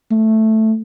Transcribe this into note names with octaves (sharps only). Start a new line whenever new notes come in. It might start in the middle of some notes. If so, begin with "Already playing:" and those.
A3